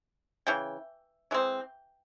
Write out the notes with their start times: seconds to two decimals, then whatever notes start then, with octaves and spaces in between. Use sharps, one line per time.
0.47 C#3 E3 G5
1.31 E3 G#3 C4